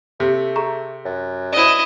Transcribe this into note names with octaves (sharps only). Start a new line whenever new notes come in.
C3 A3
G#4 A#5 C#6
F#2
E4 C5 D5 D#5